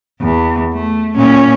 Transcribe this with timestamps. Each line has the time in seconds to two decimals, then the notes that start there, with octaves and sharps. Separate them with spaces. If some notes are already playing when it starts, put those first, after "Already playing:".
0.21 E2
0.73 A3
1.16 A#2 C#4